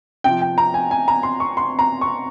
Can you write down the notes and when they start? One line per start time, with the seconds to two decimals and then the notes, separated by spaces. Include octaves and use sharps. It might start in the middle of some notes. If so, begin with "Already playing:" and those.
0.24 C3 F3 G5
0.41 G5
0.58 A#5
0.74 G#5
0.91 G#5
1.08 A#5
1.23 C6
1.40 C#6
1.57 C6
1.79 A#5
2.01 C#6